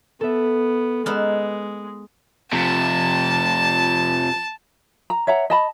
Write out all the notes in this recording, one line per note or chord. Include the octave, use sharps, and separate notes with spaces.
B3 A4 E5
G#3 B3 D#4 E6 F6
F2 C3 A5
A#5
C#5 E5 F#5 A#5
D#5 A5 B5